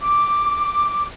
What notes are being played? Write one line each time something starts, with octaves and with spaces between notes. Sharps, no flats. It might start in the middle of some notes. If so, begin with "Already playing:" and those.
D6